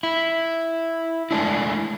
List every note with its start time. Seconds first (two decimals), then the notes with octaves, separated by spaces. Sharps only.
0.03 E4
1.31 G#3 A3 D4 E4